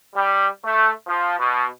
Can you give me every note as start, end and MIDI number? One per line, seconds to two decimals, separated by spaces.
0.15 0.46 55
0.63 0.90 57
1.06 1.35 53
1.38 1.65 47